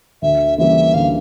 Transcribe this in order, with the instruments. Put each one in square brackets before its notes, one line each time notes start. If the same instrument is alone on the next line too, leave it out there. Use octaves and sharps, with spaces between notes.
[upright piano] D2 [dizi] E5
[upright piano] C#3 E3 G3 A#3 [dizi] E5
[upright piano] D2 [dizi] F5